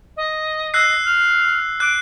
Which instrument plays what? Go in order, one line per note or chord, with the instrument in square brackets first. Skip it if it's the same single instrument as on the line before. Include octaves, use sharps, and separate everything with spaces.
[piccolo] D#5
[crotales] E6 F#6 C7
[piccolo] F6
[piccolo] D6 [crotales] F#6